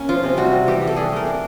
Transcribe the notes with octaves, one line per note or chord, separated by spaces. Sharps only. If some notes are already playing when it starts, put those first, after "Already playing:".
Already playing: A#3 C#4
F3 F4
C3
G3 F#4
G3
E3 G4
G3
A4
D4 G#4
A3 A#4
D4